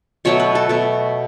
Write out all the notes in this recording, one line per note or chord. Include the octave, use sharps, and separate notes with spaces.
B2 F#3 A3 C#5
B4
A4
B2 A3